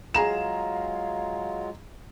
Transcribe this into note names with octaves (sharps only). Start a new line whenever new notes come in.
F#3 G#3 F4 G#4 F5 A#5 E7